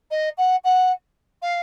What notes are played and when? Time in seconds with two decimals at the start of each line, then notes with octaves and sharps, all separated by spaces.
0.11 D#5
0.38 F#5
0.64 F#5
1.42 F5